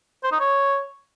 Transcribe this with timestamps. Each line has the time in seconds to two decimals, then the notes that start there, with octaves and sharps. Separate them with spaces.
0.24 C5
0.32 D#4
0.40 C#5